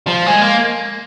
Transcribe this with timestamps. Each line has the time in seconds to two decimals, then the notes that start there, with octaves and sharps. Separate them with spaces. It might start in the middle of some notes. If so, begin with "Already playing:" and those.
0.07 F3
0.26 G#3
0.41 A#3